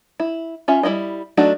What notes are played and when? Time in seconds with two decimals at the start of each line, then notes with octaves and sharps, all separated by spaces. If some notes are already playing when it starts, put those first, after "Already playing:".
0.20 E4
0.68 C#4 F4 E5
0.83 G3 E4 F4 D#5
1.37 F#3 A3 D4 D#4 F#4